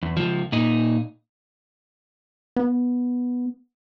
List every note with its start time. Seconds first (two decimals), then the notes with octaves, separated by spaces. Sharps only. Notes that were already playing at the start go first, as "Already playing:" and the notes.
0.03 E2
0.17 C#2 F3
0.52 A#2 D#4
2.56 B3